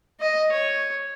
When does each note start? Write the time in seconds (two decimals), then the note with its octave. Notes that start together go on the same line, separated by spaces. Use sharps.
0.21 D#5
0.53 C#5